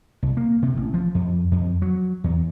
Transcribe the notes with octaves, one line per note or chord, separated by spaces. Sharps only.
C2
A#3
C3
A1
F3
F2
F2
F#3
E2